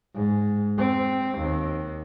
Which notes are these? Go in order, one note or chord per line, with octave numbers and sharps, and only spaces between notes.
G#2
C4
D#2